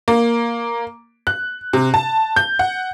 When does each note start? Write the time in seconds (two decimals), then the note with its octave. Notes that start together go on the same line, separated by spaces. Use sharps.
0.08 A#3
1.27 F#6
1.73 C3
1.94 A5
2.36 G6
2.59 F#5